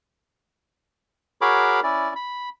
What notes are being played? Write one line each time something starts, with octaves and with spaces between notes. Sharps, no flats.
F#4 G#4 A#4 C#5 B5 D6
C#4 E4 D5
B5